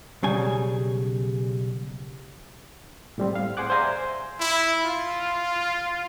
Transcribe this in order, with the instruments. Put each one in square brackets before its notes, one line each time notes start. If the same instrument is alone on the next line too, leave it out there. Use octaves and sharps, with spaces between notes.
[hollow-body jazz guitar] B1 C#3 G3 G#5
[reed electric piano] A2 G3 C4
F5
G#4 C5 F#5 G#5 D6 F#6
C5 D5 E5 F5 G#5 A#5
[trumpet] E4
F4